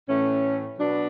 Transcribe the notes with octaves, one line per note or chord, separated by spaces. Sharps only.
A2 E3 A3 C#4
B2 F#3 B3 D4